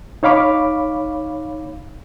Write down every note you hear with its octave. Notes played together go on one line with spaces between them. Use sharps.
D#4 C#5 F5 B5 D6